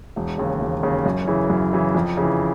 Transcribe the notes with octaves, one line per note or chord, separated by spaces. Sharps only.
E1
D#2 C#3
E1
D#2 C#3
F#2
C#3 E3
F#2
C#3 E3
F2
C#3 E3